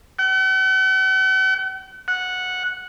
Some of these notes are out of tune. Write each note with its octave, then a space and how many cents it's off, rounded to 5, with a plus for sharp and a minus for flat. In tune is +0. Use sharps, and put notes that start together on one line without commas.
F#5 +45
F#5 -10